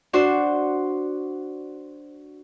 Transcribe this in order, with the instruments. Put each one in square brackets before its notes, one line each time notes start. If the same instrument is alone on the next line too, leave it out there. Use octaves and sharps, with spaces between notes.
[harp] D4 F#4 C5